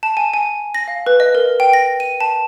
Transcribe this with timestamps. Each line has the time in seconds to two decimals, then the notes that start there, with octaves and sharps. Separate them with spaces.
0.03 A5
0.17 G#5
0.34 G#5
0.75 A#6
0.88 F5
1.06 B4
1.20 D#5
1.35 A#4
1.60 G5
1.73 A#6
2.00 D#7
2.20 A5